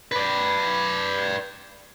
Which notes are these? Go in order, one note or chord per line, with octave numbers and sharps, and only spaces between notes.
B4 D5